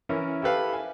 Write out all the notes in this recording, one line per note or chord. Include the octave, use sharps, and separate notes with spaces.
E3 C#4 E4 A#4 C#5
E4 G4 A4 B4 F5
G#5